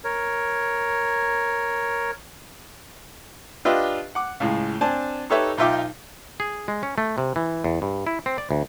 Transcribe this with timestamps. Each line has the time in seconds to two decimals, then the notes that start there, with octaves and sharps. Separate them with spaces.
0.04 A#4 C#5
3.65 D4 F4 G4 B4 D#5 E5
4.15 F#5 D6
4.40 C#2 A2 G#3
4.81 C4 D4 G#5 A5
5.30 D#4 G4 A4 B4 C#5 E5
5.58 B1 D#4 F4 E5 G5 D6
6.40 G#4
6.68 G#3
6.83 C#4
6.98 A3
7.18 C3
7.36 E3
7.64 E2
7.82 G2
8.07 E4
8.26 C4
8.38 D5
8.51 D2